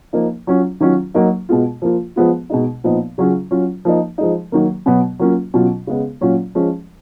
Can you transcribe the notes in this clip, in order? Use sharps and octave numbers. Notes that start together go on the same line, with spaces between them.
F3 A#3 D#4
F#3 C#4 F4
D#3 F#3 C#4 F4
F#3 A#3 D#4
B2 G#3 B3 F4
F3 A#3 F4
F3 G#3 B3 F4
B2 G#3 D#4
A#2 F3 B3 D#4
C#3 F#3 C#4 F4
F#3 C#4 F4
F3 A#3 D#4
F3 G#3 D#4
D#3 F#3 A#3
B2 F#3 B3
F#3 A#3 C#4 F4
B2 F#3 C#4 F4
C#3 G#3 B3
A#2 F#3 C#4 F4
F3 G#3 C#4